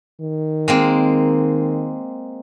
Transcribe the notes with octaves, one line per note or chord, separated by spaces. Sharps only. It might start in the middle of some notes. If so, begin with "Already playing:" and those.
D#3
G#3 A#3 C4